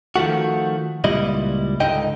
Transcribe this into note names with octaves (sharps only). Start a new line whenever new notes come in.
D#3 F3 A3 F#4
C#2 A#2 G3 E4 D#5
C#2 G#2 D3 D#4 D#5 G5